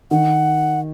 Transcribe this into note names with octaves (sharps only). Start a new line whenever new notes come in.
D#3 F#5